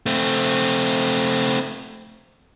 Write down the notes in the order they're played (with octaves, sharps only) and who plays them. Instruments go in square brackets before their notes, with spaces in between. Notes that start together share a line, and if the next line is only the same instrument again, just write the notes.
[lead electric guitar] A3 C4